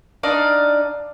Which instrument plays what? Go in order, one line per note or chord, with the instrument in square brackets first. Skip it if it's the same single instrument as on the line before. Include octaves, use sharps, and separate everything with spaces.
[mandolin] D4 D#4 D5 F5